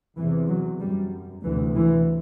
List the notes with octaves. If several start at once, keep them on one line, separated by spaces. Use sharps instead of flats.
E2 C3 E3
F#3
F#2 G3
D2 C3 E3
E3